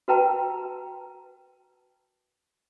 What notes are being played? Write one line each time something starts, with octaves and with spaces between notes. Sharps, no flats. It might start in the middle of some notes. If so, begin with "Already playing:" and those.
F#4 A#4 B4 G5 A5 A#5